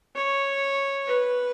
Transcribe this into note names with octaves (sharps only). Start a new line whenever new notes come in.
C#5
B4